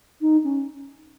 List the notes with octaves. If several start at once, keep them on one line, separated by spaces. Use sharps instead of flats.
D#4
C#4